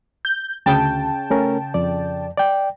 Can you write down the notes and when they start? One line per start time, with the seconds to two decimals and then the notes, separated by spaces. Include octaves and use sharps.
0.25 G6
0.66 D2 C#3 G5 A5
1.30 A3 C#4 A#4
1.74 F2 D5
2.37 D5 G5